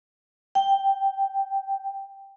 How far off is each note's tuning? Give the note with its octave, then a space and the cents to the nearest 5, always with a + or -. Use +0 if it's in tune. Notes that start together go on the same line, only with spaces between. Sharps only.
G5 +0